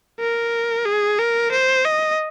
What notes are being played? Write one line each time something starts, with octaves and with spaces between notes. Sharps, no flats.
A#4
G#4
A#4
C5
D#5